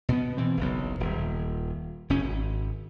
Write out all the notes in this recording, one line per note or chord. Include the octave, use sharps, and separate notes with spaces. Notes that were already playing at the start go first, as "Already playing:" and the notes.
B2 B3
B2 E3 C4
F#1 B1
D#1
F1 C#4
G#1